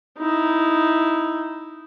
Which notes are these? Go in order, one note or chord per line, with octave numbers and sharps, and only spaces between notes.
D#4 E4